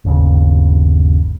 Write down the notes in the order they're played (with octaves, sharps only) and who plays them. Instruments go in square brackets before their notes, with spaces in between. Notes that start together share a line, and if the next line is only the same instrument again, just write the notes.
[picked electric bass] G1 D#2 C#3